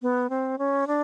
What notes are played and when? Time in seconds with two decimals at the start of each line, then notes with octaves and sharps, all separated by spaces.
0.02 B3
0.30 C4
0.58 C#4
0.87 D4